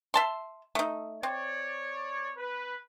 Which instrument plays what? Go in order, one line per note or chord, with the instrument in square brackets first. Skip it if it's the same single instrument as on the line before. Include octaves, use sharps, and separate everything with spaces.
[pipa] E5 A5 C6
A3 D#4
[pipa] C4 [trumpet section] C#5 D5
[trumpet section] B4